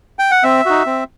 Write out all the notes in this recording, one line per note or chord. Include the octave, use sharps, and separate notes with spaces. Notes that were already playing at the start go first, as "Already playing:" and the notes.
G5
F#5
C4 E5
D#4 F#4
C4